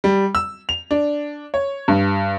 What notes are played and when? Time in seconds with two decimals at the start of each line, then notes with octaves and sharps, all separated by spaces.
0.04 G3
0.35 E6
0.69 F7
0.91 D4
1.54 C#5
1.88 G2